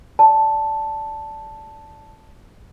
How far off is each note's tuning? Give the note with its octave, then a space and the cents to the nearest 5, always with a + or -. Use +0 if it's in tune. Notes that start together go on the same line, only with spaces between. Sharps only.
D5 -10 A5 +0